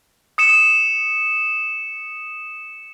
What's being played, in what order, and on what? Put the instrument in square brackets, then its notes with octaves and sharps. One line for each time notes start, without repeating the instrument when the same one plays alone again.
[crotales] D#6 C#7 E7